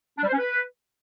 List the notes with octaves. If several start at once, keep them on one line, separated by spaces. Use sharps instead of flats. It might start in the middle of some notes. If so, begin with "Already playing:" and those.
D4
G3
C5
C#4
B4